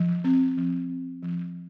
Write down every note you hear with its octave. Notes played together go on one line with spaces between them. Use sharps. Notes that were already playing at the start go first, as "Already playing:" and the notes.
Already playing: F3
C4
F3
C4
F3